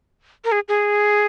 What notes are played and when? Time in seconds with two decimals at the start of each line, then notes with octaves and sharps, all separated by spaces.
0.45 A#4
0.52 G#4
0.68 G#4